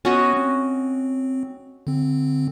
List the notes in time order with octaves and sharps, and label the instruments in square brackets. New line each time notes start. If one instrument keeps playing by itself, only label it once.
[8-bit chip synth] B3 [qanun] C#4 F#4 D#5
[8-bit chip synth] C4
D3 C4